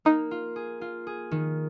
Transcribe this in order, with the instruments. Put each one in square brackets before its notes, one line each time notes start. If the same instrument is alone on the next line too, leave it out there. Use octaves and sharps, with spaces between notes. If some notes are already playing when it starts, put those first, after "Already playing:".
[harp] A#3 [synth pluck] D#4
[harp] F4
G#4
F4
G#4
D#3